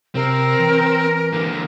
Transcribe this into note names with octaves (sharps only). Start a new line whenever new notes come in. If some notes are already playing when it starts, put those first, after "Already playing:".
C3 C4 A#4
E3
D3 A#3